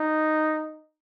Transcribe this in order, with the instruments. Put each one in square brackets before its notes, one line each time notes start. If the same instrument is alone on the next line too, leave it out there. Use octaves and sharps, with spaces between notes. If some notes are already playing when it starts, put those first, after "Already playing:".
Already playing: [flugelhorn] D#4